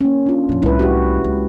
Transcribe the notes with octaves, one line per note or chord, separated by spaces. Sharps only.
A#3 C#4
D4 F4
F2 A#2
C2 A2 E4 B4
F#4 G4
C#2